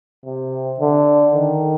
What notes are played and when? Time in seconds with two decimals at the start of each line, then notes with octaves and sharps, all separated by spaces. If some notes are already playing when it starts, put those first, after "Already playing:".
0.25 C3
0.79 D3
1.34 D#3